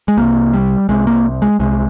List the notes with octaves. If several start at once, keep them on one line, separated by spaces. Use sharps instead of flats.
G#3
C2 C3 A#3
G3
C2 C3 G#3
A#3
G#3
C2 C3 G#3